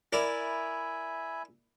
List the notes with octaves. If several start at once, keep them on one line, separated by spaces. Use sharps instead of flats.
E4 A#4 D5 E5 G#5 B5